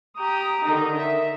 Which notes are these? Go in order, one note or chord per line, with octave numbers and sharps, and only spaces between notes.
G4 A#5 D#6
D3 D#3 D#4
E5